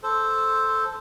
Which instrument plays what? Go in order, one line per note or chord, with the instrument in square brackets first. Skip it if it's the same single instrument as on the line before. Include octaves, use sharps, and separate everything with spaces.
[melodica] A4 C5